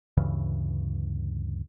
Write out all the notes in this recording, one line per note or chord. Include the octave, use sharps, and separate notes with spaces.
D2 G2 C#3 E3